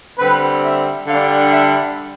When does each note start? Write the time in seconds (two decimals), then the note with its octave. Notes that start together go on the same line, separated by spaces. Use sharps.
0.18 D3 G3 C4 B4
0.63 E5
1.07 D3 G3 D4 F5
1.51 E5